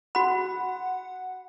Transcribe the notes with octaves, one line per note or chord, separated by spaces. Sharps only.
F#4 F#5 B5